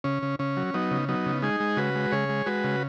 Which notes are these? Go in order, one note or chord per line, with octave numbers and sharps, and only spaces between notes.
C#3 C#4
C#3
C#3 C#4
F#3
F#3 B3 D#4
C#3
F#3 B3 D#4
C#3
G#3 D#4 G#4
G#3
C#3 F#4 B4
G#3
C#3 G#4 C#5
G#3
G#3 F#4 B4
C#3